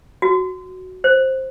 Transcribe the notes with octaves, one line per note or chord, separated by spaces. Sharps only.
F#4
C5